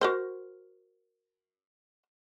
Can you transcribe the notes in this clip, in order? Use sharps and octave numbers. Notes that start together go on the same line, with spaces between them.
F#4 A#4 C5